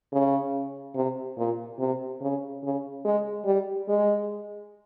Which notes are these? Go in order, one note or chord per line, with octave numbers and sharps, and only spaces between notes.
C#3
C3
A#2
C3
C#3
C#3
G#3
G3
G#3